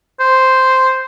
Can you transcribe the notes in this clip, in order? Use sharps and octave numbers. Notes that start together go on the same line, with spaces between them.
C5